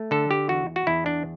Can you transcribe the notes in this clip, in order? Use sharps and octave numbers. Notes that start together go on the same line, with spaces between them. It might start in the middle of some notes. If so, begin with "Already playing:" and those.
Already playing: A3
D3 A4
G4
E2 F#4
F#4
E2 E4
D4